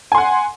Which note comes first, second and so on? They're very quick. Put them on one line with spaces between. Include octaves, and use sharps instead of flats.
G#5 C6 F#5